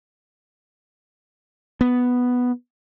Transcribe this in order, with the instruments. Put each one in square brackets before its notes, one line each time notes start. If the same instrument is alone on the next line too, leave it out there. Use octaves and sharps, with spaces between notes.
[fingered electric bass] B3